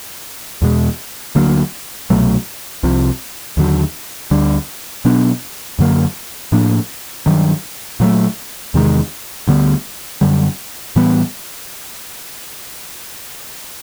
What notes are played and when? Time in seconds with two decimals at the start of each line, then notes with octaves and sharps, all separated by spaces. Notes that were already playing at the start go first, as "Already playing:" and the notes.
0.62 E2 B2 G#3
1.35 D2 D3 F#3 A#3
2.10 C2 B2 F#3 A3
2.83 C2 C3 F3
3.57 D#2 D3 F#3
4.31 D2 D3 G3
5.05 B2 F#3 B3 D4
5.79 F#2 D3 F#3 A#3
6.52 A2 F3 A#3 D4
7.26 G2 D#3 F#3
8.00 A#2 F#3 A3
8.74 E2 C3 D#3 G#3
9.48 D2 D3 G3 B3
10.21 F#2 D3 G3
10.96 A2 E3 G3 B3